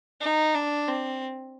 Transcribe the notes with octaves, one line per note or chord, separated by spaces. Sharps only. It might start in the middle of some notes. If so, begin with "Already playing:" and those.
D#4
D4
C4